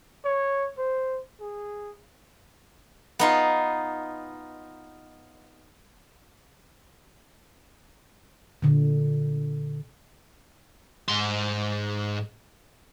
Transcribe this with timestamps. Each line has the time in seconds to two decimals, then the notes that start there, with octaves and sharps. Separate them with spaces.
0.25 C#5
0.78 C5
1.41 G#4
3.19 B3 D#4 F4
8.62 A#2 D3
11.09 G#2 C6